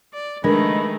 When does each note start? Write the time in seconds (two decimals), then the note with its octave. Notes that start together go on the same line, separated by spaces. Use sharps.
0.13 D5
0.44 D#3 G#3 A3 D4 A#4 B4 D#5 B5